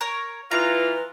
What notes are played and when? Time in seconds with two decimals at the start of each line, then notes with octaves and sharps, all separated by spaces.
0.01 A#4 C#5
0.51 E3 F4 B4 A#5